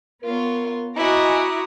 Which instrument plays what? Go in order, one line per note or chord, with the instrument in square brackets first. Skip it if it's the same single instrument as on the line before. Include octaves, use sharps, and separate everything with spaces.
[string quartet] B3 F4 C#5 [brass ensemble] A#4
[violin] E4 F#4 [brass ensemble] D#5 G#5 [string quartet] A#5 D6 D#6